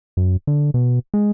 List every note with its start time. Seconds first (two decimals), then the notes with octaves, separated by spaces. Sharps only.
0.17 F#2
0.47 D3
0.74 B2
1.14 G#3